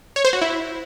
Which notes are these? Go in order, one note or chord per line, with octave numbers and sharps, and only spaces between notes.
C#5
C5
F#4
E4